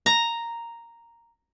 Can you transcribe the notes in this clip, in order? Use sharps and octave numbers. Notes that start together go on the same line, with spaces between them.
A#5